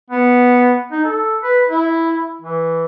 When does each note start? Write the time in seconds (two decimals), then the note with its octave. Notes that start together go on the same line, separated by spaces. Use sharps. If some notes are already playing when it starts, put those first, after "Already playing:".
0.11 B3
0.92 D#4
1.04 A4
1.43 B4
1.69 E4
2.42 E3